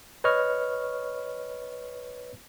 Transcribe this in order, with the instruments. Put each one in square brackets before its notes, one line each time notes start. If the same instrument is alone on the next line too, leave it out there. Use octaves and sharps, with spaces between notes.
[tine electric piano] B4 C#5 D#5 C#6 F6